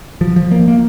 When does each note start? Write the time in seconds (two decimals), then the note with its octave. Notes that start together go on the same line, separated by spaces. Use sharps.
0.21 F3
0.36 F3
0.51 A#3
0.68 A#3